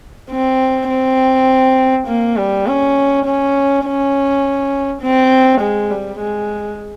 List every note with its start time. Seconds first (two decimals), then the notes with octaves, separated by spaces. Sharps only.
0.32 C4
0.90 C4
2.07 A#3
2.37 G3
2.67 C#4
3.26 C#4
3.85 C#4
5.02 C4
5.61 G#3
5.91 G3
6.20 G#3